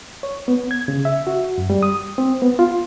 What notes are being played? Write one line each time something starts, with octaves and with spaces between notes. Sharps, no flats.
C#5
B3
G#6
C#3
E5
F#4
F#2
G3
D#6
C4
B3
F4